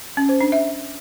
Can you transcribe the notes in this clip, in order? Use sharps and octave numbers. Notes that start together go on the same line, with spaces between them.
C#4
C5
D4
E5